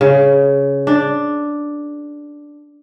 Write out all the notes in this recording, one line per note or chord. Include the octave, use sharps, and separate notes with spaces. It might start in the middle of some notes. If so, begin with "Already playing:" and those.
C#3
D4